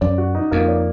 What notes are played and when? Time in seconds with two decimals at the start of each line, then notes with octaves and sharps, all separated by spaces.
0.01 F#2 D5
0.18 F#4
0.35 D#4
0.51 F2 A#3
0.68 D5